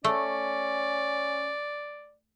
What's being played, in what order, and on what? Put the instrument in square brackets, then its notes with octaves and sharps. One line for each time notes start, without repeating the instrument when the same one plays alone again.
[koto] A3 [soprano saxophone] C#4 [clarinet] D5